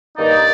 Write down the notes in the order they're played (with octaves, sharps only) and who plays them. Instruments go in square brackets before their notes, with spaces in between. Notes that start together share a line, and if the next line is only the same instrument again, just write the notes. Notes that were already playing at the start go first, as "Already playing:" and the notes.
[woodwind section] G2 D#3 A#3 D#4 [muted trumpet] D5